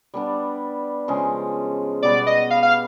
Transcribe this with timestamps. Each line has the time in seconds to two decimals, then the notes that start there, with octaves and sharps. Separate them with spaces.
0.14 G3 B3 D4
1.08 C#3 F3 G#3
2.02 B2 G3 B3 D5
2.27 D#5
2.50 F5
2.63 F5